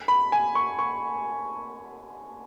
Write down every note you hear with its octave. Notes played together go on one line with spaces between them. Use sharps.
B5
G#5
C#6
C#6